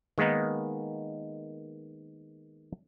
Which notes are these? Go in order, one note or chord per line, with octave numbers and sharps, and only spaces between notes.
D#3 G#3 A#3 B3 D#4